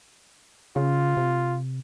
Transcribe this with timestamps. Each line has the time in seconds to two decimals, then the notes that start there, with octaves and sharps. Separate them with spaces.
0.76 C#3 F4
1.17 C3